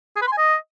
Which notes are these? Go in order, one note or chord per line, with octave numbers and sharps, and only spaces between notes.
G#4
B4
C6
G#5
D#5